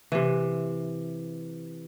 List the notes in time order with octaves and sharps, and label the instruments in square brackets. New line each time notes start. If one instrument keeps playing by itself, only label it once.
[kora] C3 E3